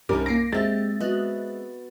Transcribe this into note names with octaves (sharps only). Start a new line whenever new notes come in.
C2 G2 G3 C#4 D#4 A#4 D6
A#3 A#6 C7 D7
G#3 C4 G4 D#5 E5 A6
B3 F#4 D#5 F#6